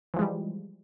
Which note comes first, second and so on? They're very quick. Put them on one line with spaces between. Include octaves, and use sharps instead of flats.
E3 F3 G#3 G3